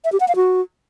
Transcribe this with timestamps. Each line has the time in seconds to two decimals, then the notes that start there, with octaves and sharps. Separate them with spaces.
0.04 E5
0.12 G4
0.20 F#5
0.28 F5
0.36 F#4